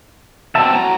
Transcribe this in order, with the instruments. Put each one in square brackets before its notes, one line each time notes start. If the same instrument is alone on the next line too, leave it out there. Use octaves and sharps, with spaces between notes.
[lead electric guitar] B2 C4 [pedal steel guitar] E5 A5
[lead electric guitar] A2 A#5 [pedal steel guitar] F#3